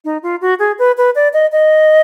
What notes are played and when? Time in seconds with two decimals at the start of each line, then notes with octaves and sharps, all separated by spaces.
0.05 D#4
0.23 F4
0.41 F#4
0.59 G#4
0.79 B4
0.97 B4
1.15 D5
1.33 D#5
1.52 D#5